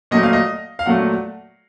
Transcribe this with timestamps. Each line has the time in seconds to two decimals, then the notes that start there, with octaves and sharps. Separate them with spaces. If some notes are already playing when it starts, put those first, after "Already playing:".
0.11 A#2 F#3 A3 D#5
0.23 F5
0.33 D#5
0.79 F5
0.86 A#2 F#3 A3 F#5